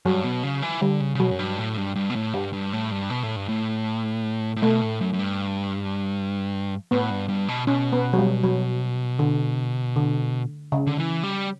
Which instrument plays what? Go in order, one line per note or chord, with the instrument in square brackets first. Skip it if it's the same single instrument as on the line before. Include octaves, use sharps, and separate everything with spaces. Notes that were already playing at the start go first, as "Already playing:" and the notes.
[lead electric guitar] G2 [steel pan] F#3
[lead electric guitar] B2
C#3
E3
[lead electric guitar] D3 [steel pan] G3
[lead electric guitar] C#3
C#3
[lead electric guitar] B2 [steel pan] F#3
[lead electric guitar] F#2
G2
A2
G2
G2
B2
A2
[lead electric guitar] G2 [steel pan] G3
[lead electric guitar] G2
A2
G2
B2
A2
G2
A2
A2
[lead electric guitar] B2 [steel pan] A3
[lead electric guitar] A2
F#2
F#2
G2
[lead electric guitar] A2 [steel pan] B3
[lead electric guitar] G2
G2
B2
[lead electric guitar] B2 [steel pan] C#4
[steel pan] B3
F#3
G3
F#3
D3
D3
C#3
[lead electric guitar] D3
E3
G3